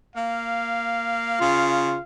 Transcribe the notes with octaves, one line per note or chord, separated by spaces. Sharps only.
A#3 F5
C#3 F4